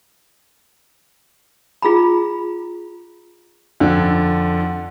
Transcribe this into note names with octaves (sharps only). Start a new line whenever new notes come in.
F4 G#4 A#5 B5
F2 D3